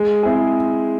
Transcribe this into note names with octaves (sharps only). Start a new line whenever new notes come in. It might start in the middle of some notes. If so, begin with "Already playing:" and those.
Already playing: G#3
C4 E4 G#4